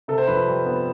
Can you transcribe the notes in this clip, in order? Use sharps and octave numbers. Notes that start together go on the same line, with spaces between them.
C3 A4
C5
F2 B4
G3
B3